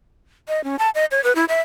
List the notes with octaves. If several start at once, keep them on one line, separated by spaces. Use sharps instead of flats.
D#5
C#4
A5
D#5
C#5
B4
E4
E5